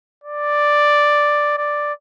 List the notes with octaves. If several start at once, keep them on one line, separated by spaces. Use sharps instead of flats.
D5
D5